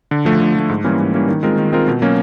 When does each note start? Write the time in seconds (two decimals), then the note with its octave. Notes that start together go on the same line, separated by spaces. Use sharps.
0.11 D3
0.25 F3 A3
0.41 D3
0.55 F3 A3
0.69 G#2
0.84 E3 G3 A#3 C#4
0.98 G#2
1.14 E3 G3 A#3 C#4
1.29 D#3
1.43 G#3 C4 F4 A#4
1.58 D#3
1.72 G#3 C4 F4 A#4
1.88 B2
2.02 F#3 A#3 C#4